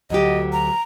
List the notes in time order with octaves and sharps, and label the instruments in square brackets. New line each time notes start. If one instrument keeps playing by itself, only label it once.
[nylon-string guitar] D2 F#3 G4 [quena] D#5
[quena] A#5